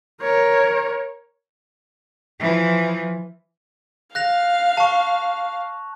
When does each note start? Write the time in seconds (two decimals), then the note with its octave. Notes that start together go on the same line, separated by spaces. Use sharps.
0.21 A#4 C#5
2.40 E3 F3
4.15 F5 F#6 A#6 F7
4.77 A5 C#6